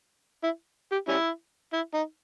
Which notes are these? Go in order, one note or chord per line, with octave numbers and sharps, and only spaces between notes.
E4
G4
G3 C#4 E4
E4
D#4